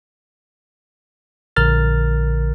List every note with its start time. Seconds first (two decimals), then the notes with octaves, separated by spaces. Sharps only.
1.56 A#1 D3 A#4 F6 A6